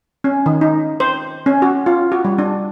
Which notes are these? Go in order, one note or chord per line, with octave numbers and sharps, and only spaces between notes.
C#4
D#3
D#4
C5
C#4
F#4
F4
F#4
G3
D4